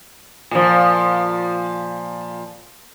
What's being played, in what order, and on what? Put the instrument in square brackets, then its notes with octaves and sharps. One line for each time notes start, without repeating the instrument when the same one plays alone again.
[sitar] A#2 F3